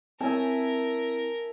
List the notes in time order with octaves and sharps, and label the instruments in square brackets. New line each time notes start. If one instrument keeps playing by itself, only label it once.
[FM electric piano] C4 C#5 [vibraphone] E4 [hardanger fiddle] A#4 [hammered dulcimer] E5 G#5 A5